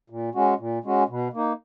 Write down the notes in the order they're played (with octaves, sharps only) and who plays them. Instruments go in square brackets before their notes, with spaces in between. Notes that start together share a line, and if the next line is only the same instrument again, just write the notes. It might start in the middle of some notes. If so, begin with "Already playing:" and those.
[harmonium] A#2
G#3 C#4 F#4
A#2
G#3 C#4 F#4
B2
A#3 D#4